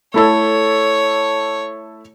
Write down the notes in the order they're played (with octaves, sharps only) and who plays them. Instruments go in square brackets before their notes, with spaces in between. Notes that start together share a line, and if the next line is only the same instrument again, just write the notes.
[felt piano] A3 E4 A4 [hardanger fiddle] C#5